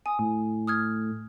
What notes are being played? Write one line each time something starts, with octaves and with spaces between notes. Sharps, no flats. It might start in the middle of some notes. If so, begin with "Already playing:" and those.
G#5 D#6
A2
D#6 F6 G#6